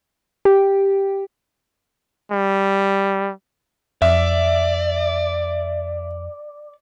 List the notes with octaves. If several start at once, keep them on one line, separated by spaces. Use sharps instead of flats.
G4
G3
F2 D5 E5